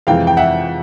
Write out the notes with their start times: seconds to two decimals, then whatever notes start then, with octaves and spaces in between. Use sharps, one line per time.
0.07 F2 C3 E3 G#3 F5 G5
0.27 G5
0.37 E5 F#5